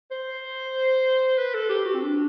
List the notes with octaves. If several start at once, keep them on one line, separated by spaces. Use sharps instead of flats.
C5
B4
A4
G4
F#4
C4
D4